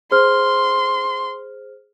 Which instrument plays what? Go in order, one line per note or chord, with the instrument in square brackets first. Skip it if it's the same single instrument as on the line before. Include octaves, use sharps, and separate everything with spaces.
[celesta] G#4 C5 F6 [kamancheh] C6